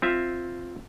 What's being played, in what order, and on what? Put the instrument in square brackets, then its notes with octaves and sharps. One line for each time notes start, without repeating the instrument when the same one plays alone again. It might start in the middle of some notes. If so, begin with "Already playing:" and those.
[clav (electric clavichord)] C4 F4 E5